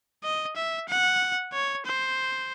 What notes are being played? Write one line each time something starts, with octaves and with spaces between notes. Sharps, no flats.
D#5
E5
F#5
C#5
C5